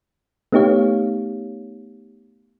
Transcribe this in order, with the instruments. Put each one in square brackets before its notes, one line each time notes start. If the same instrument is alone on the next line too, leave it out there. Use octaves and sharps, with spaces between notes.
[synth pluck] A3 B3 D#4 G4 C#5 F5